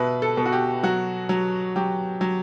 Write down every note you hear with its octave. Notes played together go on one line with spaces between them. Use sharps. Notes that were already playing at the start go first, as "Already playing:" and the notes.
Already playing: B2 B4 E5
A4
B2
F#4
G4
F#3 F#4
F#3
F#3 G4
F#3